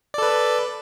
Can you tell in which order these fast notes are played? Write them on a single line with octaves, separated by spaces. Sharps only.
D5 A4 B4